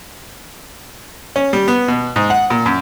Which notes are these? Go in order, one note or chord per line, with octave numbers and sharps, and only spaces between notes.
C#4
G3
B3
B2
G#2
F#5
A#2
F#2